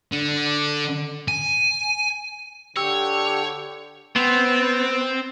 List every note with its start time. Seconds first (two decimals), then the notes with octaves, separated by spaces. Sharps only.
0.12 D3
1.28 G#5
2.77 D3 G4 C#5 E6
4.16 B3 C4 C5